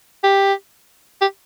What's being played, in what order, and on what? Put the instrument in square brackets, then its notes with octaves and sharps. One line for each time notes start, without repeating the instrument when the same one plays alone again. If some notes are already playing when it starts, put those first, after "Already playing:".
[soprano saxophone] G4
G4